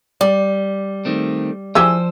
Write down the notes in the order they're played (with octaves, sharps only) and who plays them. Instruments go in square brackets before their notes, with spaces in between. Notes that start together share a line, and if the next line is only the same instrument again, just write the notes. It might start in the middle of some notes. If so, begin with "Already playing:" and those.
[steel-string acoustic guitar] G3 [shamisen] D5
[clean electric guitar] D#3 A3 C4
[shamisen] E3 G4 G#4 [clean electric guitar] F3 C5 [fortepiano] E6